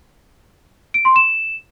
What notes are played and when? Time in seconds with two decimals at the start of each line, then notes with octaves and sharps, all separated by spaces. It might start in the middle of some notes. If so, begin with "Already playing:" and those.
0.94 D7
1.05 C6
1.16 E7